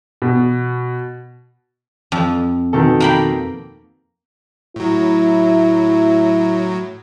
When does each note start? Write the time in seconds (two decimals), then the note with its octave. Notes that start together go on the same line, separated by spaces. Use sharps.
0.22 B2
2.12 F2
2.73 B2 D#3 A4
3.00 A#3 G5 B5
4.76 A2 F#3 E4